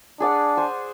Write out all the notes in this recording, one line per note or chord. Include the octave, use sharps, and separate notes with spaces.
D4 G#4 D5 F#5
C5 G#5